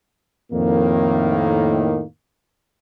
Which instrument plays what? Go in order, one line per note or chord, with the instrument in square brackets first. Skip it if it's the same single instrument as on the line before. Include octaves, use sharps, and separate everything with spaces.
[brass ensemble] F2 A2 D#3 A#3